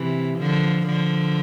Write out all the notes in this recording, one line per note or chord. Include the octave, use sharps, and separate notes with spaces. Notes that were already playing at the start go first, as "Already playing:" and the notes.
Already playing: C3 E3
D3 F3
D3 F3